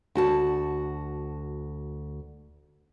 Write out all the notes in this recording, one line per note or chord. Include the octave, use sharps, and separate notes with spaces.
D2 F#4 A5